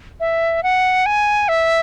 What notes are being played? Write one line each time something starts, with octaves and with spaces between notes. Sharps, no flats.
E5
F#5
G#5
E5